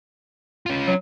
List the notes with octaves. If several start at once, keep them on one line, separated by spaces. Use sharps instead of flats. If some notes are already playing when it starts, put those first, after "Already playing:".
C#4 F4
F#3